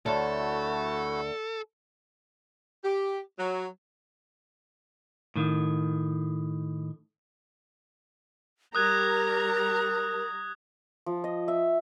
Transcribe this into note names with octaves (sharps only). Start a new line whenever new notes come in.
D2 A3 E4 F#4 A4 C#5 A5
G4
F#3
A2 D#3
G3 G4 A#4 A#5 D#6 F#6 G#6
F3
D#5
E5